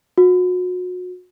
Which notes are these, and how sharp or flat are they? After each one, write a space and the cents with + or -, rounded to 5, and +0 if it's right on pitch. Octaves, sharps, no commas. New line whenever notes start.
F#4 -35